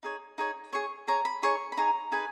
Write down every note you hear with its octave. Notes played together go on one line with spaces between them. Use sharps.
D#4 G#4 C#5
D#4 G#4 C#5
G#4 C#5 C#6
G#4 C#5 A#5
B5
D#4 G#4 C#5 C#6
B5
D#4 G#4 C#5 A#5
D#4 G#4 B4 G#5